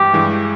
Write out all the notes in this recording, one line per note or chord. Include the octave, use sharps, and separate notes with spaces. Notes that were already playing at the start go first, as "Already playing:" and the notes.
Already playing: G2 E3 G#3 G4
G2 E3 G#3